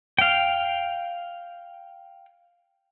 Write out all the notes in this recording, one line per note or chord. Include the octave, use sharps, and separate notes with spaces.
F5 G5